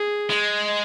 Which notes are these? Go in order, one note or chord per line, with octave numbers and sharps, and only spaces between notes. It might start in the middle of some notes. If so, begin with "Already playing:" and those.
Already playing: G#4
G#3